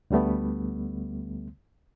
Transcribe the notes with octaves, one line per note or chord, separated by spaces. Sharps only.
D2 D3 G3 A3 B3